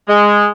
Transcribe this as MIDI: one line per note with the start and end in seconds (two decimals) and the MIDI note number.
0.09 0.48 56